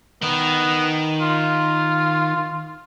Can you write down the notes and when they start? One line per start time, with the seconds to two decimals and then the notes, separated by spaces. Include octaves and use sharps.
0.22 D#3 B3
1.21 F4